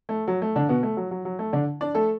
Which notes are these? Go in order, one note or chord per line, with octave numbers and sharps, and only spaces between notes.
A3
F#3
A3
D3 D4
B2 B3
A3
F#3
F#3
F#3
A3
D3 D4
D4 D5
A3 A4